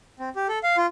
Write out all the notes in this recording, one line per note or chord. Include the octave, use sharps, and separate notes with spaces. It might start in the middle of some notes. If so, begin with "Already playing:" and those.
C4
G4
A4
F5
F4